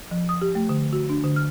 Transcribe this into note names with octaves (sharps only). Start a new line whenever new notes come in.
F3
D#6
G4
A3
D3
F#4
D4
D3
F6